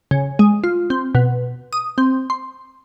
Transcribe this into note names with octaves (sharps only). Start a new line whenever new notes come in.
C#3
G#3
F4
C4
B2
D#6
C4
C6